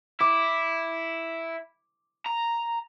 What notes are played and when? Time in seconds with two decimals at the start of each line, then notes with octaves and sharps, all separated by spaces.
0.21 E4 D6
2.26 A#5